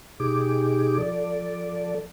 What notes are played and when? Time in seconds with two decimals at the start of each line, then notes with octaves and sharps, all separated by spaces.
0.20 B2 D#4 G4 G#4 D6
0.98 F3 A4 D5